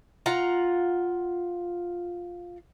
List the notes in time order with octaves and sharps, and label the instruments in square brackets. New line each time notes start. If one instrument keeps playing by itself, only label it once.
[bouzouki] F4 F#5 A#5